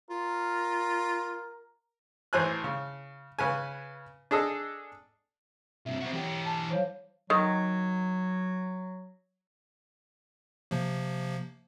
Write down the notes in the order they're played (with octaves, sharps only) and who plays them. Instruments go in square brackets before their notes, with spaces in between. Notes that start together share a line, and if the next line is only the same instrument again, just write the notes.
[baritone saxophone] F4 [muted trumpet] A#4
[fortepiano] A1 E3 C5 G#5 F#6
C#3
C#3 B4 G#5
D4 G#4 A4 D#5
[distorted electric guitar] G2 C3 [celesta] E5
[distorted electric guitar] C4 F#4
E3 G4
[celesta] C#7
G#5 A5
C5 C#5 F5
[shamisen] D#3 [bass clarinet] F#3
[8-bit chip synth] C3 F3 A#3